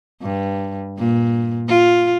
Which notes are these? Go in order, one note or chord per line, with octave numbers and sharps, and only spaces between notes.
G2
A#2
F4